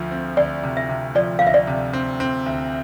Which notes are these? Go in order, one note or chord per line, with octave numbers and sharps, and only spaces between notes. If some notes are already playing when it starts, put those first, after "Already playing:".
Already playing: D2 F3
C4
D2 D5
C3
E5
C3
F3 D5
D2 F5
E5
D5
C3
C4
C4
D2